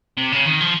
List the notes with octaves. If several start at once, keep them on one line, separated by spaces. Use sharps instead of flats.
C3
C#3
D#3
F3